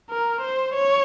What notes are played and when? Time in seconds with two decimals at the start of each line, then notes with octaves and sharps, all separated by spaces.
0.10 A#4
0.42 C5
0.75 C#5